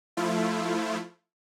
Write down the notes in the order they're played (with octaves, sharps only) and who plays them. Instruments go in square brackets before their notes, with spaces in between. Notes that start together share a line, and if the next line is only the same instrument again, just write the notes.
[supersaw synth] F3 A3 E4 F4